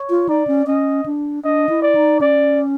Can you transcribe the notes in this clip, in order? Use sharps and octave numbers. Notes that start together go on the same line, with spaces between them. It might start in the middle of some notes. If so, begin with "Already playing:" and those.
Already playing: C#5
F4
D#4 D5
C#4
C#4 D#5
D4
D4 D#5
E4
D5
D#4
C#4 D5